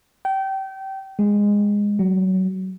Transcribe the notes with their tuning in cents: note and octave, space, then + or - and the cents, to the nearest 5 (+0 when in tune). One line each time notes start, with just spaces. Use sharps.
G5 -25
G#3 -15
F#3 +20